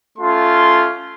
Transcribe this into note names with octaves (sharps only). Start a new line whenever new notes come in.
A3 C#4 F4 C6